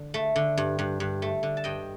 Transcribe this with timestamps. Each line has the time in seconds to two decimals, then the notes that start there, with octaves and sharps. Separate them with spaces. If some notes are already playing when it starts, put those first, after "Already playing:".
Already playing: D3
0.14 A3
0.36 D3
0.57 G2
0.79 G2
1.00 G2
1.22 A3
1.43 D3
1.57 A5
1.64 G2 D#5 G5